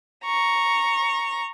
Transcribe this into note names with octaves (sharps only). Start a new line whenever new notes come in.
A#5 C#6